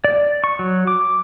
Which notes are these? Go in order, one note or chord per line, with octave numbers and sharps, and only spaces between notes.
D5
C#6
F#3
D6